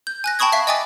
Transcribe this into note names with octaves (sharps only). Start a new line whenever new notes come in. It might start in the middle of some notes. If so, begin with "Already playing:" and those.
G6
G#5 F#6 A#6
G5 A5 B5 C#6 D#6 G#6
E5 F5 C#6 B6
D#5 G5 G#5 D6 D#6 A6